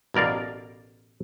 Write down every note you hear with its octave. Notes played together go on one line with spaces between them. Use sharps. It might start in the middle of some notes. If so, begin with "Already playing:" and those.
A1 B2 A#4 D5 F5